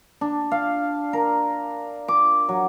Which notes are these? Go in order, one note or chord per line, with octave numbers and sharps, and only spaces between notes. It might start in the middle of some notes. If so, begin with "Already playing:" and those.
D4
F5
A#4
D6
F#3